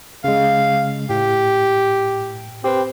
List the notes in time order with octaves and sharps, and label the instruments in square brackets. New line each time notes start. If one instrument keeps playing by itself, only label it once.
[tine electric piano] C#3 G#3 [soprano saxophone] F5
[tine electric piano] A2 [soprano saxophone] G4
[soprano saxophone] C4 [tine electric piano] G4 B4